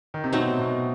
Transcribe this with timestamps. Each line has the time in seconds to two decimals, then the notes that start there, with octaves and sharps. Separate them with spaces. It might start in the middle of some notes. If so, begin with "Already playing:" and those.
0.14 D#3
0.24 C3
0.33 B2 F#3 A3 C4 D#4
0.59 B2